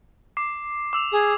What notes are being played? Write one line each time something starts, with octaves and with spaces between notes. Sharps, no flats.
D6 C7
D6 E6 F7
G#4